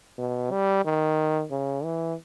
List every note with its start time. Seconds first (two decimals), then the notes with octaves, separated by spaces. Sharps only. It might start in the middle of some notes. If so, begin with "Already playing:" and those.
0.18 B2
0.51 G3
0.85 D#3
1.51 C#3
1.84 E3